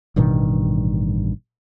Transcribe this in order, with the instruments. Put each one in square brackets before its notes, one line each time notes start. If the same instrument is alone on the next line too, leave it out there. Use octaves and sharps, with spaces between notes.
[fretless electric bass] A1 G2 B2 D#3